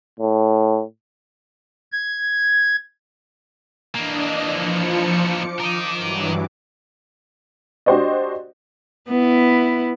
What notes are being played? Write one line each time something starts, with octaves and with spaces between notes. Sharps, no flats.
A2
G#6
E3 A#3 D4 D#5
F3 C#7
D6
A#4 D#5
G2 E3 F#3
D4 F#4 G4 C5 D5 D#5
B3 E4